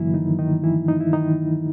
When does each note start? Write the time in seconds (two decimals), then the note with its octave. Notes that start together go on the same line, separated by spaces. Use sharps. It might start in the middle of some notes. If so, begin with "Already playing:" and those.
Already playing: G2 D3 E3 F#3 A#3 E4
0.14 D#3 D#4
0.39 D#3 D#4
0.64 E3 E4
0.88 D#4
1.00 E4
1.13 D#3 D#4